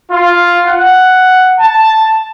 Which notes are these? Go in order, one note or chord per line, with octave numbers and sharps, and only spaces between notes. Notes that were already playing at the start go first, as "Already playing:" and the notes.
F4
F#5
A5